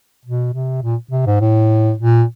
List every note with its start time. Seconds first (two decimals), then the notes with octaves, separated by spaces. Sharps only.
0.25 B2
0.53 C3
0.82 A#2
1.11 C3
1.26 G#2
1.40 A2
1.97 A#2